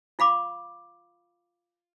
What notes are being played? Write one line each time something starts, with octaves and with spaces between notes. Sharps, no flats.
F4 F5 B5 D6